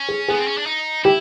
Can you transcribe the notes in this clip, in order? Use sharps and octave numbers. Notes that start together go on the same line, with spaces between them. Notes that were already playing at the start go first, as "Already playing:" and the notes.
Already playing: C#4
G#4
B3 G#4
C4
C#4
D4
D#4
E4 G4